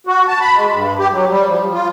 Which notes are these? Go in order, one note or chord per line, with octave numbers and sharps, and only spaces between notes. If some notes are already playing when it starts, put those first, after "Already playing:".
F#4
A5
B5
G#3
G2
G4
F#3
G3
F3
F4